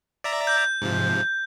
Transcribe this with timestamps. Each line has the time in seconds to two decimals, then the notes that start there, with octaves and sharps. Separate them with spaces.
0.24 D5 E5 A#5
0.47 G6
0.82 G#2 C3 F3